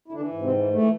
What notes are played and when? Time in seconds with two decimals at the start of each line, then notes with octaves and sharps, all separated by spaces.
0.08 E4
0.12 D3 E3 D4
0.32 G#2
0.42 C3 C4
0.52 E3
0.71 E3 A3